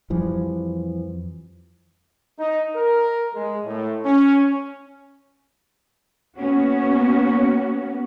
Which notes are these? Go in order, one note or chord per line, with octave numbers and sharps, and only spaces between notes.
F2 E3 F3 G3
D#4
A#4
G#3
A2
C#4
A#3 B3 C#4 F#4